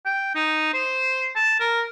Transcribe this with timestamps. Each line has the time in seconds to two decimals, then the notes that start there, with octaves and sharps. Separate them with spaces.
0.06 G5
0.35 D#4
0.74 C5
1.36 A5
1.60 A#4